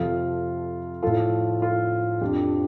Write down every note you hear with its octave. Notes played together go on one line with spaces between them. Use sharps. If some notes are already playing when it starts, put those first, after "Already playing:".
Already playing: F2 C3 F3 F4 A4
A2 F3 F4 A4
F4 A4
F2 F3 D4 G4